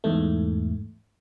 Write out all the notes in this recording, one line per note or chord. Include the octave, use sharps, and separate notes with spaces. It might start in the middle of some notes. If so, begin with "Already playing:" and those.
E2 G#2 A3